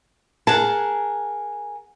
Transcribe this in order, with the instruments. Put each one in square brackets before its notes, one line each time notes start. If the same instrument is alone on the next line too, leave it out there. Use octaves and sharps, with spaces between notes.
[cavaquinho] G#4 A#4 F#5 [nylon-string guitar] A5